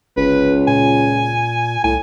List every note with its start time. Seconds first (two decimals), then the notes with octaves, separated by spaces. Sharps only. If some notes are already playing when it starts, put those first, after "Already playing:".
0.17 G1 C#2 B4
0.68 A#2 G#5
1.84 C2 A2 G#5